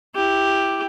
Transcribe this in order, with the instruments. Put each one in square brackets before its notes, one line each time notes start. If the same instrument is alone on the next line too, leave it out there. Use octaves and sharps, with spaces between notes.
[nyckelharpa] E4 G4